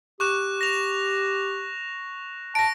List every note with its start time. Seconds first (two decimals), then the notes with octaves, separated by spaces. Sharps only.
0.20 G4 C#6 F#6 E7
0.61 A#6 F7
2.55 A5 A#6 D7